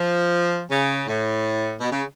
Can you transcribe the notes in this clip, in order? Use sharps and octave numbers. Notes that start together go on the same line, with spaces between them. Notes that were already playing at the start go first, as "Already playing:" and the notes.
Already playing: F3
C#3
A2
B2
C#3